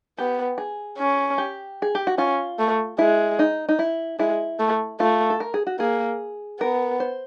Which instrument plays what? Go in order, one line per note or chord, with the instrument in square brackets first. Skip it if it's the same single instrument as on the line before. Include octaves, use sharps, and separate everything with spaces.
[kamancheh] B3 [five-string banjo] G4
[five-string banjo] G#4
[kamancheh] C#4
[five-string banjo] G4
G#4
G4
F#4
[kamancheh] C#4 [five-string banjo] F4
[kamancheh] A3
[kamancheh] G#3 [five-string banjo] E4
[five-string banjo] D#4
D#4
E4
[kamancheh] G#3 [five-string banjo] E4
[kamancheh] A3
[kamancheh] A3 [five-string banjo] F4
[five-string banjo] A4
A#4
G#4
F#4
[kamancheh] A#3 [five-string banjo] G#4
[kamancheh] B3 [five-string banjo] A#4
[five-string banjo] C5